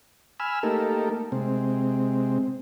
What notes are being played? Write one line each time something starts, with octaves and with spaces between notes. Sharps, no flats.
G#5 B5 E6 F6
A3 A#3 D#4 G4 A4 A#4
C3 G#3 C4